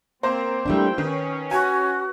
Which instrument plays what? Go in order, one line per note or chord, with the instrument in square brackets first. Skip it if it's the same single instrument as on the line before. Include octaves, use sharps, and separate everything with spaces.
[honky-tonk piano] A#3 A#4 C5 [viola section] C4
[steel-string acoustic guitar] G3 A3 D4 [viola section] E4 G5
[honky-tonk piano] D#3 [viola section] C#4 [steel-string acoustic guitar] B4
[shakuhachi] F#4 [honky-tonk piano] G#5